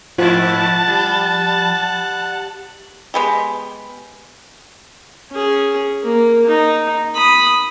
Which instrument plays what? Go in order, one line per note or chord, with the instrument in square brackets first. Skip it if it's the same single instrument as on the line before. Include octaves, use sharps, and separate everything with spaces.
[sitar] G#2 E4 [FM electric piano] F3 [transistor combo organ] F#5 [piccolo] A5
[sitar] G3
[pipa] G#3 B3 G4
[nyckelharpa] C#4 G#4
A#3
D#4
B5 D#6